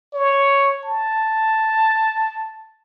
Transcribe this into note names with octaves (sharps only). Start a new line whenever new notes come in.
C#5
A5